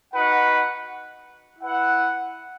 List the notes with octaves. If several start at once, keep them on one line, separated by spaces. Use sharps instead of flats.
D#4 F#4 B4 F#5
E4 B4 F#5